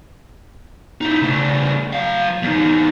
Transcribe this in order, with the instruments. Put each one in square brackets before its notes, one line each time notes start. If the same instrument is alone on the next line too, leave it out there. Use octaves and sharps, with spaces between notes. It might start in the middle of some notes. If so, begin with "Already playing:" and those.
[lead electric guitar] D#4 E4
C#3 A3
F#3 F5
E2 D#4